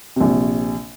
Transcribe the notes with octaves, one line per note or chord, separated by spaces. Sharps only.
A#1 C3